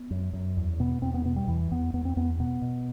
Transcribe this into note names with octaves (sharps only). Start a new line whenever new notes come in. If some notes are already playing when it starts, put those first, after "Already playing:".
Already playing: B3
F#2
F#2
E2
B2 B3
E2 C4
B3
B2 B3
G3
E2 E3
E2 B3
E2 B3
C4
E2 B3
B2 B3
B2